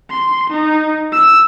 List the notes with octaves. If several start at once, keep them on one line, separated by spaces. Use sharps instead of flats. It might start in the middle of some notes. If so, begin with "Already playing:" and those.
C6
D#4
E6